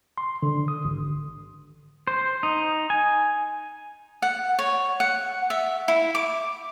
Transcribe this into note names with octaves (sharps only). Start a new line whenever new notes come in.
C6
D3
D#6
G#1
C5
D#4
G#5
F#5
C#5
F#5
E5
E4
D6